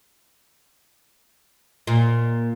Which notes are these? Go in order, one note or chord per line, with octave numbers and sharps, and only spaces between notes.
A#2